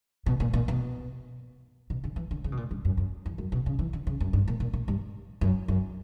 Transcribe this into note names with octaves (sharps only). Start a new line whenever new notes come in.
B2
A#2
A#2
B2
B2
D3
E3
D3
C#3
B2
A#2
G2
F#2
F#2
E2
F#2
B2
C#3
E3
D3
C#3
F#2
G2
A#2
A#2
A#2
G2
F#2
F#2